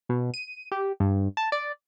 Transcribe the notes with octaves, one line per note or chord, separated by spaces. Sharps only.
B2
D#7
G4
G2
A5
D5